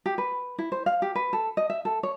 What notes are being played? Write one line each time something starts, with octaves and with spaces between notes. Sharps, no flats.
G4
B4
E4
C5
F5
G4
B4
A4
D#5
E5
A4
C#5